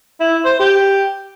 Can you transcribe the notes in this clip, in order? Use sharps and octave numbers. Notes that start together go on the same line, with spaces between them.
E4
C5
G4